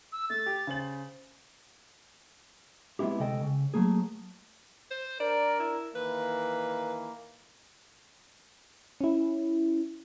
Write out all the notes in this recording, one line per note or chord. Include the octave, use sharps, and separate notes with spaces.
E6
A3 A6
G4
C#3 C5 F#7
G#3 B3 C4 E4 G4
D2 C3 G#3 A4 D#5 G5
C#3
F#3 A3 A#3 G#4
C5
D4 A#4 D5
E4
D#3 E3 A#3 B4
C#4 E4